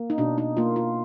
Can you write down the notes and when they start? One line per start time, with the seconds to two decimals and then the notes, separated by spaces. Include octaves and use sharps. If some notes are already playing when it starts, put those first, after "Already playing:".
Already playing: A#3
0.10 D#4
0.18 B2 D4
0.38 D#4
0.57 A#3 F4
0.76 F4